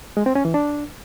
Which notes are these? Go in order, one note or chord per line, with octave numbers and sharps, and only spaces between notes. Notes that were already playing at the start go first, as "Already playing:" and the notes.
G#3
C4
C#4
E3
D4